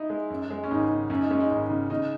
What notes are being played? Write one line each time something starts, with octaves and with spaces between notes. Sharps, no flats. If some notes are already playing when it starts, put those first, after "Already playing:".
Already playing: D#4 E4
G#3
F#2
G#3
C#4
G#1 D#4
C#3
F#2 C#4
D#4
G#3 C#4
D#4
G#1 D#4
C#3
C#3 D#4